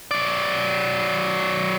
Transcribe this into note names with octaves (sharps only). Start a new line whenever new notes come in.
F#3 D5